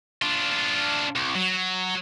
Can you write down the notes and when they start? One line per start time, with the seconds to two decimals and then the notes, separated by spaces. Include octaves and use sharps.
0.22 D4 F4
1.15 C2
1.35 F#3